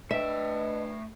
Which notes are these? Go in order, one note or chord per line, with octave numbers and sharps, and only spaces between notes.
A3 D4 B4 D#5 E5 G5